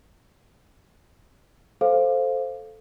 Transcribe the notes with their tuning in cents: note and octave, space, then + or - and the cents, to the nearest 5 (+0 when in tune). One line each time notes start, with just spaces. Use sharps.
A4 -5 C5 +0 F5 +0